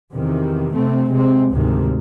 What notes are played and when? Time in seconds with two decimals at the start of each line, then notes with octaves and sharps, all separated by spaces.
0.15 E2 C3 D#3
0.74 C3 A3 C4
1.12 C3 G#3 C4
1.54 D2 G#2 C3 D#3